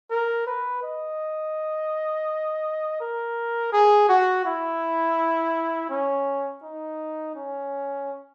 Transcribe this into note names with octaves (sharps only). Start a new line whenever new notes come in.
A#4
B4
D#5
A#4
G#4
F#4
E4
C#4
D#4
C#4